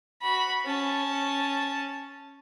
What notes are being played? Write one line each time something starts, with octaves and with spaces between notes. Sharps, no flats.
F#4 B5
C#4 A5